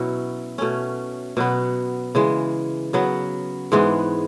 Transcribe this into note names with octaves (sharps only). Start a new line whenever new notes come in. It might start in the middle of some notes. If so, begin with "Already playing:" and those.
Already playing: B2 F#3 C#4 E4
B2 A3 C#4
B2 F#3 B3
C#3 E3 G#3
C#3 F#3 B3
G#2 E3 G#3 B3